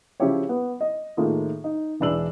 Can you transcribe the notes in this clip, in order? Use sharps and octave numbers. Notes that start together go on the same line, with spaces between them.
C#3 F3 C#4 E4 G4 C#5
B3
D#5
A2 D#3 A#3 F4 G#4
D#4
E1 E3 G#3 D4 E6 F#7